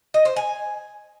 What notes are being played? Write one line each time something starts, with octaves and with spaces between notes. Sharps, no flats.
D#5
C5
G#5